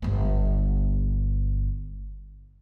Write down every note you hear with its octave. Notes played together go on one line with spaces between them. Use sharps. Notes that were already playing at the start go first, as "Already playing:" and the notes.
G1 B3